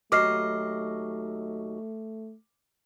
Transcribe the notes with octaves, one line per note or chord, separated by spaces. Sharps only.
D#2 F#3 A3 D#5 D6 F6 C7